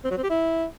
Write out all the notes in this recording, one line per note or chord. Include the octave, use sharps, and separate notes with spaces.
C4
F#3
C4
G4
E4